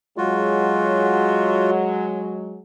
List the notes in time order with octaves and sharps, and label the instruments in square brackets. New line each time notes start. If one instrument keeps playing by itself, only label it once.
[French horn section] F#3 G#3 [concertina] F4 F#4